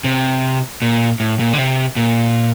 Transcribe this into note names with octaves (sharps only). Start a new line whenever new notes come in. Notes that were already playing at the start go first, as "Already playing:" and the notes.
C3
A#2
A2
A#2
D3
C3
A#2